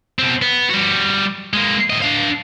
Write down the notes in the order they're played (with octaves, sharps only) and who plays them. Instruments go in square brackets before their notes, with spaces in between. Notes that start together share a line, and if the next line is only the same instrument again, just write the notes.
[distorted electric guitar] B2 C4
B3
G3 F#4
G#3 A#3
A2 D#5
D4 F5